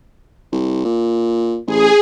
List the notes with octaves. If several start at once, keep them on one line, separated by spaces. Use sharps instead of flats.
C2
A#2
A1 G#4